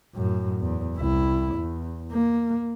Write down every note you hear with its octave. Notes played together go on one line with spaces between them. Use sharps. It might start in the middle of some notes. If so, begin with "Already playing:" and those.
F#2 A2
E2
C2 E4
E2
A#3